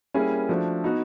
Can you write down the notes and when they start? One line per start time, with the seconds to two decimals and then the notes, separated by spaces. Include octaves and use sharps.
0.14 G3 A#3 C#4 E4 G#4
0.49 F3 A3 D4 F#4 A4
0.84 B3 D#4 F#4